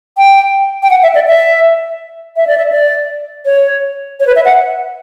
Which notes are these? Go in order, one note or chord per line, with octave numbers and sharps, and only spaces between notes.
G5
G5
F#5
E5
D5
E5
E5
D5
E5
D5
C#5
C#5
B4
E5
F#5